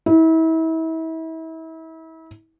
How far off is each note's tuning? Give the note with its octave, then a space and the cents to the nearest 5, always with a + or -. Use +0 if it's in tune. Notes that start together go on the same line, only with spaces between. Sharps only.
E4 -35